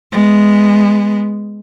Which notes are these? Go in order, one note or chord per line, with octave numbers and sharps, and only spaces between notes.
G#3 B3